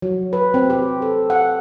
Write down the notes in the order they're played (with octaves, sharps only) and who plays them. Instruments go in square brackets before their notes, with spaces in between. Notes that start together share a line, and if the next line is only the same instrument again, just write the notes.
[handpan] F#3
B4
C4
G4
A4
F#5